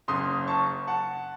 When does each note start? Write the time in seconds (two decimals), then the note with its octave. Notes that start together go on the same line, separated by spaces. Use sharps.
0.08 F#1 F#2 C#3 C6 D#6
0.48 A5 C#6
0.87 F#5 A5